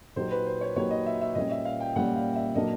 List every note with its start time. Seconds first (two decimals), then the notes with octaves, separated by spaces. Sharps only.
0.16 A#2 F#3 A#3 D#4 G4 C5
0.31 B4
0.46 C5
0.61 C#5
0.76 A#2 F#3 A#3 D#4 G4 C#5
0.91 D#5
1.06 E5
1.21 E5
1.35 A#2 G3 A#3 C#4 D#5
1.51 E5
1.65 F5
1.80 G5
1.96 A#2 G3 A#3 C#4 F#5
2.16 F5
2.36 E5
2.55 A#2 F#3 A#3 D4 D#5